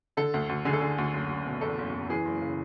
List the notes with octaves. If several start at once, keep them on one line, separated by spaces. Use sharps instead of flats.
D3 A4
D2
D2
D3 G#4
A4
D3 G#4
D2
F#1
F#1
B2
E2 A4
F#1
F#1
E3 G#4
F#1
C#3